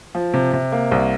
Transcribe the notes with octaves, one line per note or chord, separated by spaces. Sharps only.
F3
C3
C3
A#3
C2